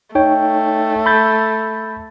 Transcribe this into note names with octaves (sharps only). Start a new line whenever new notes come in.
A3 D#4 C#5 G5
B5 G6 A6